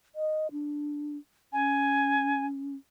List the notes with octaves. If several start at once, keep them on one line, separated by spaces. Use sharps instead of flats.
D#5
D4
C#4 G#5